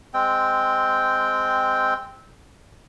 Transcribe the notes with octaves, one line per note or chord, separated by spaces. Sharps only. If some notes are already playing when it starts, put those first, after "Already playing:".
G#3 C4 G5